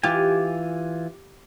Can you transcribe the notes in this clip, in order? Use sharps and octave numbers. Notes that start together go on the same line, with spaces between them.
E3 F4 G4 G#5